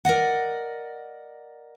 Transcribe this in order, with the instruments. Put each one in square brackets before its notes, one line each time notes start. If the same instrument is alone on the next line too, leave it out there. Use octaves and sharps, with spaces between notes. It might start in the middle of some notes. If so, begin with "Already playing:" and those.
[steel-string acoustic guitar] A#4 D5 D#5 F#5